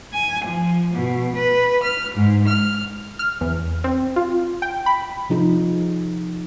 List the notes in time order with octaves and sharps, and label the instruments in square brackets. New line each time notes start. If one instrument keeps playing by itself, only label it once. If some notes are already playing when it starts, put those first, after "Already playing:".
[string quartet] G#5
F3
B2
B4
F6
G#2
F6
[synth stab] F6
E2
C4
F4
G5
B5
[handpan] C3 F3 D#4 G#4